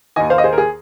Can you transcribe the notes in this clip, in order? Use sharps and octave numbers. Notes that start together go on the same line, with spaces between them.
D#2 D#3 D#5 G#5
C5 F5
D#5
G#4 C5
A#4
G#4